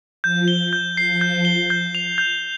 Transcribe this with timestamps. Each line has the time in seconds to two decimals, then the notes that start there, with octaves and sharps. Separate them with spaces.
0.24 F3 G6
0.48 G7
0.73 G6
0.96 F3 C7
1.21 G6
1.45 G7
1.70 G6
1.95 F7
2.18 G6